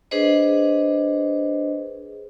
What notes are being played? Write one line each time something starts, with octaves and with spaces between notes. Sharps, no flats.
D4 G#4 B4 C5 D#5